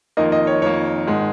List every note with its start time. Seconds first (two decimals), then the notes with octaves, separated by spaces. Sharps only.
0.17 F2 D#3 A#3 D#5
0.32 D#5
0.47 C#5
0.62 F2 D#3 A#3 C#5
1.07 G#1 D#3 G#3